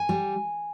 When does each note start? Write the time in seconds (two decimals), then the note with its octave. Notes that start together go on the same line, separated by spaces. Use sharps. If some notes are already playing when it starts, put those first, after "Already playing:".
Already playing: G#5
0.09 G3